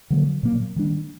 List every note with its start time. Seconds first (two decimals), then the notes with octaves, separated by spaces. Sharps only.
0.10 D3 F#3 A#3
0.43 A#2 F#3 A#3
0.76 D#3 G3 D4